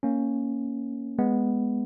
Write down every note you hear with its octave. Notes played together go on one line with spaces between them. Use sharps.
A#3 C#4
G#3 B3